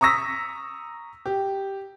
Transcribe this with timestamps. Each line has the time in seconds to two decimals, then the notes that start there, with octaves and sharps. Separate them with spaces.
0.01 A#5 C#6 D#6 E6 A#6 B6
1.26 G4